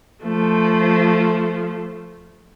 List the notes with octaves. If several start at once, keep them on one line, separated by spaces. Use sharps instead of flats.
F3 A3